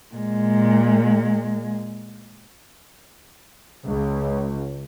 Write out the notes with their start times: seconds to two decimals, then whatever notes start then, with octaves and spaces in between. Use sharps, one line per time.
0.15 A#2 G#3
3.85 C#2